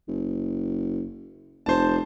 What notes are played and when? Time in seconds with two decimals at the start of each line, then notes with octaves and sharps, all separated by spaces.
0.08 F#1
1.66 F1 C5 A5